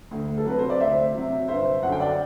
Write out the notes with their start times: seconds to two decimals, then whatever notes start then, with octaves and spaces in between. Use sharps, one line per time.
0.11 D2
0.38 A4
0.45 C3 F#3 B4
0.59 C5
0.70 D5
0.80 D2 C5 E5
1.15 C3 F#3
1.48 G1 C5 E5
1.82 F#2 D3 F#5
1.92 G5
2.00 D5 F#5